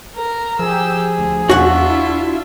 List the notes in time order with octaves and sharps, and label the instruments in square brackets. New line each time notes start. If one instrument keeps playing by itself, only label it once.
[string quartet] A#4 A#5
[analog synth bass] F3 [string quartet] G4 E6 [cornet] G#4
[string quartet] D2
[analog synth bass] E2 [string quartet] D4 F4 E5 [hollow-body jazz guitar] F#4 F#5
[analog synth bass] E4